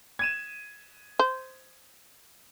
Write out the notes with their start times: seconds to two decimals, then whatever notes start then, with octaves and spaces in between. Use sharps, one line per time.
0.19 G#6 D#7 E7
1.19 C5